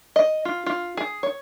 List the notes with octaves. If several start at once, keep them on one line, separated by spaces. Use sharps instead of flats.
D#5
F4
F4
G#4
C#5